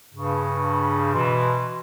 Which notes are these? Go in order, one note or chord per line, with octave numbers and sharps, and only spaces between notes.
G2 C#3
B2 E3 C6